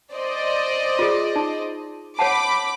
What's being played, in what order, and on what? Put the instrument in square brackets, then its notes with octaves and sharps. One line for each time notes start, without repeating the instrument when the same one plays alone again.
[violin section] C5 D5 D#5
[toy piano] F4 G#4
D#4
[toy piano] C#5 F#5 A5 [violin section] B5 D6